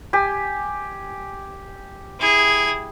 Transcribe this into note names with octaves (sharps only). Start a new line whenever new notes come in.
G4 G#5
E4 G#4